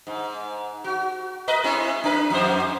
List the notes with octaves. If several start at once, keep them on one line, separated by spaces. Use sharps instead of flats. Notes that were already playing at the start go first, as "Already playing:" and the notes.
G#2
F#4
A#4 B4 D#5
G#3 C4 E4
D4 A#4 B4
F2 G#2 C5